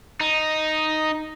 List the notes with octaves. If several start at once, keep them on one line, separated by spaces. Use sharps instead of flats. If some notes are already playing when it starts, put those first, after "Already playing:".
D#4